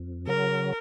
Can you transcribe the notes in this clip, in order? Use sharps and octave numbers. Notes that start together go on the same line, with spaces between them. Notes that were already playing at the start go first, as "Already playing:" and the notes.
Already playing: F2
C#3 F#3 A#4